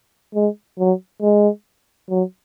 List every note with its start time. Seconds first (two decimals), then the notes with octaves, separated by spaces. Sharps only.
0.34 G#3
0.79 F#3
1.22 G#3
2.09 F#3